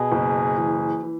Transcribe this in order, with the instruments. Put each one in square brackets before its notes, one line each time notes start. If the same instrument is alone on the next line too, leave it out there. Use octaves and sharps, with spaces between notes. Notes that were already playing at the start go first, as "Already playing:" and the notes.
Already playing: [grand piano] B2 [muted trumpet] G#4
[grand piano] F#1
E3
E3